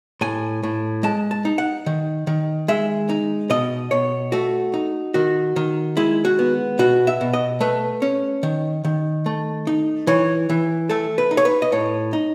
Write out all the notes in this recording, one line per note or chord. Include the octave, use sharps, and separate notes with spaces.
A2 G#5
A2
G#3 A5
A5
D#4
F#5
D#3
D#3
G#3 E5
D#4
B2 D#5
B2 C#5
A3 F#4
D#4
D#3 F#4
D#3
G#3 E4
F#4
B3
B2 F#4
E5
B2
D#5
A3 B4
C#4
D#3
D#3
A3
D#4
E3 C#5
E3
A3 A4
B4
D#4
C#5
B4
D#5
A2 C#5
D#4